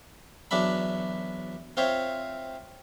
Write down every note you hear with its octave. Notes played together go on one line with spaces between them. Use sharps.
E2 F#3 D4 E5 B5
C4 F4 C5 C#5 E5